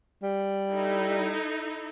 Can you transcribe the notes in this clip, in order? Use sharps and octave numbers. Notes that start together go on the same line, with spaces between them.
G3
D#4 E4 A4